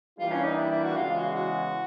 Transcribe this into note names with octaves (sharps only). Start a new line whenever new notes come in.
E3 G3 A#3 D4 F4
C#4
D#4
E4
E4
F#4
E2 C#3 E3 G#3 F4
F#4
F#4